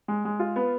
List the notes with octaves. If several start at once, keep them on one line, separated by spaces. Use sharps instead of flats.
G#3
G#3
F4
B3